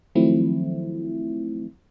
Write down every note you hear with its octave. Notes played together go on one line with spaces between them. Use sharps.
D#3 F3 F#3 A3 C4 E4